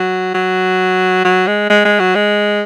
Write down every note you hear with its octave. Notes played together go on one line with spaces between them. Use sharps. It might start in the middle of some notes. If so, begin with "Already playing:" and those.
Already playing: F#3
F#3
F#3
G#3
G#3
G#3
F#3
G#3